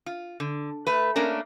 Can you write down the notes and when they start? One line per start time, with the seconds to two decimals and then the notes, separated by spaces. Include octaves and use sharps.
0.06 F4
0.40 D3
0.87 A3 B4
1.16 A3 A#3 C#4 D4 A#4